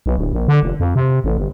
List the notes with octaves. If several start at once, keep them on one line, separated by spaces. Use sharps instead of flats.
B1
D1
A#1
D3
F1
F2
C3
A1
G1